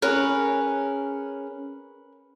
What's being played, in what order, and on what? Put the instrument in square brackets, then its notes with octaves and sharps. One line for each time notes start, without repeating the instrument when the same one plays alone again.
[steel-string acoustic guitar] C#4 G#4 C#5 [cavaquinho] A#4 B4